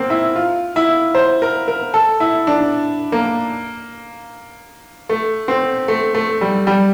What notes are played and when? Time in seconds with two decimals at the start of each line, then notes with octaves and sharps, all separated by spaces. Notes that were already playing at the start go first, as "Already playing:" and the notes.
Already playing: A#3 C4
0.10 E4
0.36 F4
0.76 E4
1.15 C5
1.42 A#4
1.68 A#4
1.94 A4
2.20 E4
2.47 D4
3.12 A#3
5.09 A3
5.48 C4
5.88 A3
6.14 A3
6.41 G3
6.67 G3